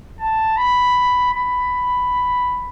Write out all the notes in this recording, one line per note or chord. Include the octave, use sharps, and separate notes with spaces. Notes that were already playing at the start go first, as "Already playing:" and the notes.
A5
B5
B5